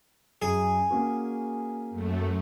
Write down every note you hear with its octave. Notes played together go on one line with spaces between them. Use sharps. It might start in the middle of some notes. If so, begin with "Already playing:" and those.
F#2 G#4
A#3 C#4 F#4
F#2 A3